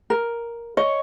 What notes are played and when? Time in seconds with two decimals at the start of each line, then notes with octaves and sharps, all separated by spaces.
0.10 A#4
0.77 C#5 D#5